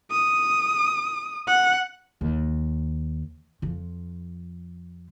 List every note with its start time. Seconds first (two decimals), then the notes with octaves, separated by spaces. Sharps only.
0.11 D#6
1.48 F#5
2.21 D#2
3.62 F2 F3